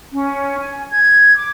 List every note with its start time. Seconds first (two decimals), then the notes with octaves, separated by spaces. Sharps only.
0.12 C#4
0.59 G#5
0.91 G#6
1.36 D6